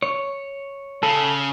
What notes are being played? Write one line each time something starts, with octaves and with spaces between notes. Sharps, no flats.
C#5
C#3 A4